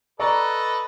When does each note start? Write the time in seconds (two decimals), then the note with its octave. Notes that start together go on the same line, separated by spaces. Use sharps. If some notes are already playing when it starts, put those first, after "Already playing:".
0.19 A4 B4 D5 D#5 A#5 C#6